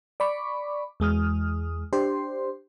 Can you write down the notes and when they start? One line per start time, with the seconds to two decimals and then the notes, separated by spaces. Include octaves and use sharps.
0.20 D5 B5 C#6 D6
1.00 E2 G#3 D#6 F6
1.93 D4 G4 C5 C6